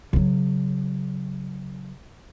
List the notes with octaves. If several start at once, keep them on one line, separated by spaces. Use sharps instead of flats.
C#3 F#3